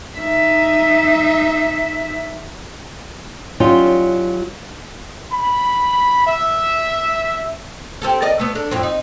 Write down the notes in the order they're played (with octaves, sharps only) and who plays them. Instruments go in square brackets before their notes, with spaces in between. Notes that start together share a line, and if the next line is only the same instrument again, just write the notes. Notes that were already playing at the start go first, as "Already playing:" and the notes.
[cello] D#4 E5
[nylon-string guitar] F#3 G3 C#4 D#4 F4
[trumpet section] B5
E5
[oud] C4 G4 A4
A#4 D5 D#5
A3 B3
D4 A4
F2 A2 C4
D#4